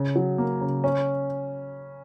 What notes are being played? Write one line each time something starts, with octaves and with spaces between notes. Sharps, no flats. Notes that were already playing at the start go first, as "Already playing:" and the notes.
Already playing: C#3
F#3
A#3
C#3
C#4